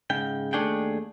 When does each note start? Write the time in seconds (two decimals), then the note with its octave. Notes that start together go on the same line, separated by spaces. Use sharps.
0.10 G#2 C#3 G5
0.53 D#2 A3 D4 G#4 G5